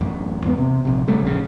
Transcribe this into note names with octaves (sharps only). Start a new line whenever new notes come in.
A1 F#2
E2 G#2 B3
C3
A#1 C3
C#3 G3 A3
A#1 C#3